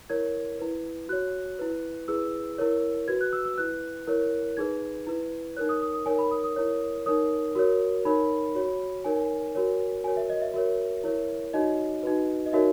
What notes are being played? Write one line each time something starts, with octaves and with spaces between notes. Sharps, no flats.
E4 A#4 C#5 G#6
E4 B4
F#4 C#5 F#6
E4 B4
E4 G#4 B4 E6
E4 A#4 C#5
F#4 B4 G#6
F#6
E6
E6
E4 B4 F#6
E4 A#4 C#5
D#4 G#4 B4 G#6
E4 B4
D#4 A#4 C#5 F#6
D#6
D#6
D#6
D#4 A#4 C#5 G#5
B5
D#6
D#6
E4 A#4 C#5
D#4 A#4 C#5 D#6
F#4 A#4 C#5
D#4 A#4 C#5 B5
F#4 C#5
D#4 A#4 C#5 G#5
F#4 A#4 C#5
F#4 A#4 C#5 G#5
E5
D#5
E5
F#4 A#4 C#5 E5
E4 A#4 C#5
D#4 F#4 C#5 D#5
D#4 F#4 B4
D#5
D#4 F#4 A#4 C#5 E5